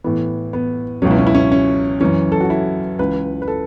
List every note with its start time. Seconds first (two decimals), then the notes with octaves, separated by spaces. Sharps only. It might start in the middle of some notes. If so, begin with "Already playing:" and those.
0.04 A2 E3 B3
0.53 B3
1.02 C#2 B2 F#3 C#4
1.11 E4
1.18 C#4
1.27 E4
1.35 C#4
1.52 C#4
2.01 F#2 C#3 E3 C#4
2.32 A4
2.41 F#4
2.50 E4
2.99 C#2 C#3 E3 B4
3.42 B4
3.48 A4